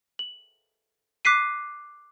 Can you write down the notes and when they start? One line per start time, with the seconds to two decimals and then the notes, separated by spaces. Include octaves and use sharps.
0.19 F#7
1.25 D6 F#6 B6 C7 D#7